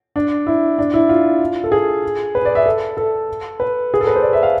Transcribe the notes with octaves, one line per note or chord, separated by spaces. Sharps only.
D4
E4
D4
E4
F4
A4
G#4
B4
D5
E5
A4
A4
B4
G#4
A4
B4
C5
D5
E5
F5